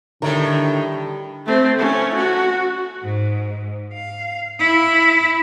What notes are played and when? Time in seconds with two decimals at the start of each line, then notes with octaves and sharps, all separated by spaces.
0.22 A2 D3 D#3 G3 A3 A#4
1.46 A3 C4
1.79 A3 C#4
2.15 F#4
3.03 G#2
3.93 F5
4.59 E4